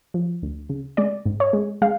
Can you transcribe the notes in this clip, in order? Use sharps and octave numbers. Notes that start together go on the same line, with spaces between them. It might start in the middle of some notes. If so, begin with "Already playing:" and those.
F3
D2
C#3
G#3 D5
G#2
C#5
G#3
G#3 F5